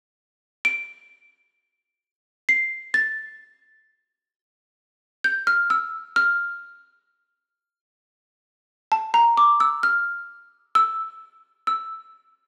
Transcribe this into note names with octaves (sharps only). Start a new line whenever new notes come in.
D7
C7
A6
G6
F6
E6
F6
A5
A#5
D6
E6
F6
E6
E6